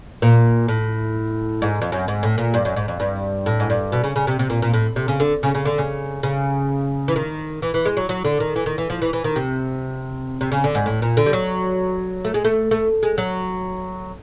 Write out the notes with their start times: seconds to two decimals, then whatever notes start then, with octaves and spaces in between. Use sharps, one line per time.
0.22 A#2
0.68 A2
1.62 G#2
1.81 F2
1.92 F#2
2.08 G#2
2.23 A2
2.38 A#2
2.54 G2
2.65 F#2
2.76 G#2
2.88 F2
3.00 G2
3.46 A2
3.60 G#2
3.70 G2
3.92 B2
4.04 C#3
4.16 C#3
4.27 C3
4.39 C3
4.50 A#2
4.62 A#2
4.73 A2
4.96 C3
5.08 C#3
5.20 D3
5.43 C#3
5.55 C#3
5.65 D3
5.78 C#3
6.23 C#3
7.08 E3
7.16 D#3
7.62 E3
7.74 E3
7.85 G#3
7.97 F#3
8.09 F#3
8.24 D3
8.40 D#3
8.56 E3
8.66 D#3
8.78 E3
8.90 F3
9.02 E3
9.13 E3
9.24 D#3
9.36 C3
10.41 C3
10.52 C#3
10.64 D3
10.75 G#2
10.86 A2
11.02 A#2
11.17 D3
11.26 G3
11.33 F#3
12.25 A3
12.34 G#3
12.45 A3
12.71 A3
13.03 G#3
13.18 F#3